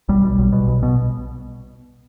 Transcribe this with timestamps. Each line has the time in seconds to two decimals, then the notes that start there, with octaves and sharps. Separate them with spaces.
0.09 B1 G3
0.24 B1
0.39 B1
0.53 B2
0.67 B1
0.83 B2